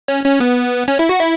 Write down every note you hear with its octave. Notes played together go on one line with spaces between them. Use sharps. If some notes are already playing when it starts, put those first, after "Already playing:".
C#4
C#4
B3
C#4
E4
F#4
E4